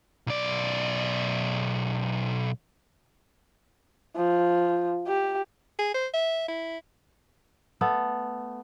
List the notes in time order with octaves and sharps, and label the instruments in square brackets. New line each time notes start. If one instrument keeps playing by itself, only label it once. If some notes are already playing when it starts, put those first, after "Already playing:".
[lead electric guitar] B1 D5
[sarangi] F3
G4
[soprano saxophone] G#4
C5
E5
E4
[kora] A3 B3 A4